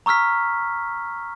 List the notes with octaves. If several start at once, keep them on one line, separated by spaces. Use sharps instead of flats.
A#5 C#6 E6 F6 B6